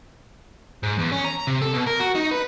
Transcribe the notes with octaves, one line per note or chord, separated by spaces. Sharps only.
G#2
E2
C#4
A#5
C3
A4
B2
A#4
F#4
D#4
B4